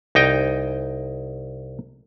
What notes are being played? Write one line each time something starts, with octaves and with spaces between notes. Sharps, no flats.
C2 D#4 G5